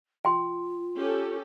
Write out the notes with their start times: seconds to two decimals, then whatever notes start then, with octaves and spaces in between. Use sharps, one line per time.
0.25 F4 G5 C6
0.96 C#4 G4 A4